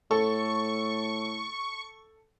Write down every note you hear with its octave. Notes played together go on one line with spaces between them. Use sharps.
A2 A4 C#6